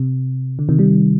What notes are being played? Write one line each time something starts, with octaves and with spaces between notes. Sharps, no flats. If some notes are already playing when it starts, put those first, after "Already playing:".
Already playing: C3
D3
C3 D#3
D#3 G3